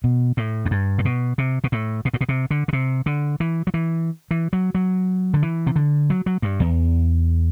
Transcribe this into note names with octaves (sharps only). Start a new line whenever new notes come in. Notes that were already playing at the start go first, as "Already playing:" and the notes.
B2
A2
F#2
G2
A2
B2
C3
B2
A2
B2
A2
B2
C3
D3
D3
C3
D3
E3
F#3
E3
E3
F#3
F#3
D3
E3
C3
D3
F#3
F#3
G2
E2